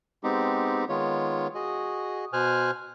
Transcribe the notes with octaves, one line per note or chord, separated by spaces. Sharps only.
G#3 B3 C4 D#4 G4
D#3 G#3 B3 F4 C#5
F#4 G#4 D#5
B2 C5 G#5 F6 F#6